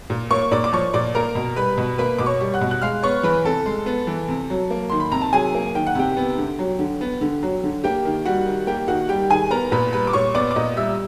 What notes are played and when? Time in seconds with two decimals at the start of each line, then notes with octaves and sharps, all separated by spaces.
0.10 A#2
0.31 A#3 C#5 C#6
0.52 A#2 D5 D6
0.64 D6
0.73 F3 C#5 C#6
0.94 A#2 D5 D6
1.15 A#3 A#4 A#5
1.35 B2
1.56 G3 B4 B5
1.78 B2
1.98 A#3 B4 B5
2.18 B2 D6
2.26 C#5 C#6
2.40 G3
2.54 F#5 F#6
2.61 B2
2.71 F#6
2.82 G#3 F5 F6
3.03 B3 C#5 C#6
3.23 E3 B4 B5
3.44 C3 A4 A5
3.66 G#3
3.86 B3
4.07 E3
4.29 C3
4.50 F#3
4.70 A#3
4.90 D#3 C6
5.00 B5
5.12 C3 A#5
5.22 A5
5.32 F#3 G#4 G#5
5.54 A#3
5.75 D#3 G5
5.87 F#5
5.95 C3 G4 G5
6.17 B3
6.38 D3
6.59 F#3
6.79 D3
7.01 B3
7.21 D3
7.43 F#3
7.64 D3
7.84 A#3 G4 G5
8.05 D#3
8.25 G3 F#4 F#5
8.46 D#3
8.67 A#3 G4 G5
8.88 D#3 F#4 F#5
9.09 G3 G4 G5
9.30 D#3 G#4 G#5
9.51 B3 A#4 A#5
9.72 A#2 B4 B5
9.92 G3 B4 B5
10.07 D6
10.13 A#2 C#5 C#6
10.34 B3 D5 D6
10.51 D6
10.56 A#2 D#5 D#6
10.76 G3 E5 E6